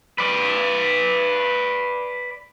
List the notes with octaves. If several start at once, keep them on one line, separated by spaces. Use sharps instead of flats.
B4 D5